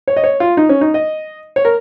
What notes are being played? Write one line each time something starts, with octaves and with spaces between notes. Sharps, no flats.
C#5
D#5
C#5
F4
D#4
C#4
D#4
D#5
C#5
A#4